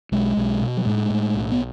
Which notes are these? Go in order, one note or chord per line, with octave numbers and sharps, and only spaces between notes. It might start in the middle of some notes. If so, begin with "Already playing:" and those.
B1 G#3
B1
B2
F#3
A2 G#3
A2
B1
B3